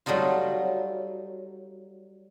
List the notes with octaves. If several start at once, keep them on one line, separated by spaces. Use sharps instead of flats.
F#3 G3 A3 D#4 F4